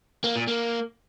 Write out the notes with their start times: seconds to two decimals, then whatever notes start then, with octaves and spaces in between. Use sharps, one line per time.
0.24 A#3
0.36 A#2
0.48 A#3